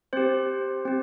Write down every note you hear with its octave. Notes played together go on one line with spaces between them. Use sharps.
C4 G4 C5
C4 G4